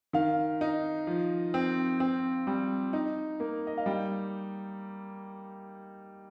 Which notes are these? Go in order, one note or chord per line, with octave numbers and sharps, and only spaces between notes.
D#3 F5
D#4
F3
C4
C4
G3
D#4
A#3
D#5
F5
G3 G5